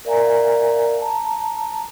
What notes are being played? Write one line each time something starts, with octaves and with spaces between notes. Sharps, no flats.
A#4 D5 E5 F5 G#5 A#5
A5 A#5